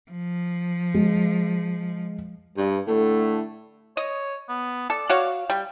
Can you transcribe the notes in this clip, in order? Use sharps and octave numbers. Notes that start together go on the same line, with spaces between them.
F3
G#3
G2
A2 D3 A3
C#5 D#5
B3
A4 D5
F#4 C#5 F5
G3 G5